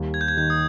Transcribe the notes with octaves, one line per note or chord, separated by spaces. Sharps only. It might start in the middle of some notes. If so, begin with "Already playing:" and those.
Already playing: D#2 G3
G#6
G6
G#6
D#3 G6
D#6